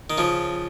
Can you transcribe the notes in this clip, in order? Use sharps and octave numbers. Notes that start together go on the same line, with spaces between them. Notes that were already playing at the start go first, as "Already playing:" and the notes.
D#3
C#3 F3